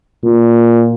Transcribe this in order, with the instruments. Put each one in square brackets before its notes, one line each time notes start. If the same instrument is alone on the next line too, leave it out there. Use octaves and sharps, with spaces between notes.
[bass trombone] A#2